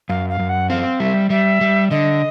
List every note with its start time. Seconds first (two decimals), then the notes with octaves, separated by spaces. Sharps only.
0.09 F#2 F5
0.29 F5
0.39 F#2
0.49 F#5
0.70 C4 F5
0.99 G3 E5
1.30 G3 E5
1.61 G3
1.90 D3 D#5